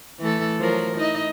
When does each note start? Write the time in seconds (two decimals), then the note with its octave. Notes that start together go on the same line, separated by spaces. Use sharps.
0.20 E3 A3 A4
0.59 F3 F#3 A#4
0.98 D#4 E4 D#5